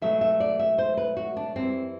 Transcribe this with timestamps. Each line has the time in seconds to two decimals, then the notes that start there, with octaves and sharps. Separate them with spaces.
0.02 B2 F#3 A3 E5
0.21 E5
0.40 D5
0.59 E5
0.78 C5
0.97 B4
1.17 F#4
1.37 D4
1.55 F#2 E3 G3 C4